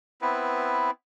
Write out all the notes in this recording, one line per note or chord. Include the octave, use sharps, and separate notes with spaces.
B3 C4 E4 B4